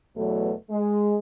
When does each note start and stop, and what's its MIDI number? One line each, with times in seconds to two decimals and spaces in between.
0.17 0.53 40
0.17 0.53 47
0.17 0.53 54
0.17 0.53 57
0.71 1.17 56